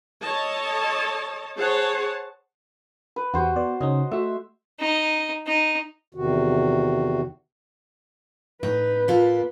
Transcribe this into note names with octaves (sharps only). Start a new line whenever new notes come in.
A4 C#5 D#5 A5
G#4 C5 C#5 F#5 A5
B4
E2 F#4 G4 C5
B3 D5
C#3 C#4 D#4 D#5
A3 F#4 E5
D#4
D#4
E2 C3 D#3 F#4
A2 D#4 B4
A#3 F4 A4